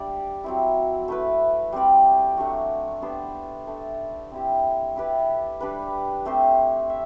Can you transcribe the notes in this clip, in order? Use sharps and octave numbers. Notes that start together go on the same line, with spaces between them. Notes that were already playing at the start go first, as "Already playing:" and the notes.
Already playing: G3 D4 G4 D5 E5
F#3 C4 E4
A3 E4 B4
G3 C4 G4 D5
F#3 A3 D4 F#4
B3 D4 G4 C5
A3 D4 A4
C4 E4 G4
E4 G4 B4 D5
G3 D4 G4 B4
A3 C4 G4 C5
E5